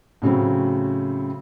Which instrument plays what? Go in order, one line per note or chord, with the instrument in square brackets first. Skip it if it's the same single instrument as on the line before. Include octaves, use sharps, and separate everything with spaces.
[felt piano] A2 C#3 F#3 C4